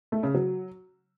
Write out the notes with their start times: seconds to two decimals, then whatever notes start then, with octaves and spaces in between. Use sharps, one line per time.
0.12 A3
0.23 C#3
0.34 F#3